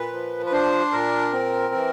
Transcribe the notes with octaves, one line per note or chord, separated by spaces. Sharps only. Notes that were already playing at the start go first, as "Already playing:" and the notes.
Already playing: A#2 B4
F3
B4
D4 C5
A#2 A#4
C4
E3